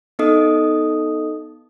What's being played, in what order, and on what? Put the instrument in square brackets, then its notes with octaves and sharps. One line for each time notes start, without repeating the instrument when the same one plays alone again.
[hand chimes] B3 D#4 A4 D#5 D#6